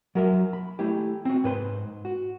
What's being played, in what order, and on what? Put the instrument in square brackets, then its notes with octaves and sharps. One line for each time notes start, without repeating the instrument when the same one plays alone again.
[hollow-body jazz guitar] F#3 A#4 E5
B5
A3 E4 G4
C4 F#4
G#2 B4 C5
F#4